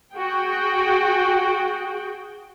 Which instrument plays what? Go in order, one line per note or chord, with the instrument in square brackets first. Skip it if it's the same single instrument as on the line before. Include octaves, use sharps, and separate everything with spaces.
[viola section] F#4 G#4 G5